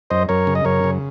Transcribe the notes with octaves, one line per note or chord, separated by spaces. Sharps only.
F#2 C5 D#5
F#2 A#4 C#5
C#3
D#5
F#2 A#4 C#5
C#3